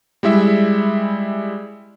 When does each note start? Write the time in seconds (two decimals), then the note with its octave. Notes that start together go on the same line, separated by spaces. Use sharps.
0.23 G3 G#3 E4 E5